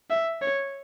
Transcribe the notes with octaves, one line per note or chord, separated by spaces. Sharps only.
E5
C#5